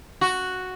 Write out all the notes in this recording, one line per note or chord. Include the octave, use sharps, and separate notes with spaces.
F#4